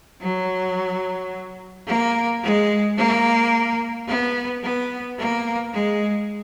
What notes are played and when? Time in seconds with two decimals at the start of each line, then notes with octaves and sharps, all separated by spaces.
0.21 F#3
1.87 A#3
2.43 G#3
2.97 A#3
4.08 B3
4.63 B3
5.18 A#3
5.73 G#3